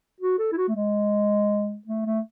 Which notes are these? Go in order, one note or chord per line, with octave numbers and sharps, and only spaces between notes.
F#4
A4
E4
F#4
A3
G#3
A3
A3